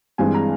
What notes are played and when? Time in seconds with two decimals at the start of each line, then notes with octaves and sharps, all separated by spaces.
0.18 G2 E3 G#3 C4 G#5
0.35 A#5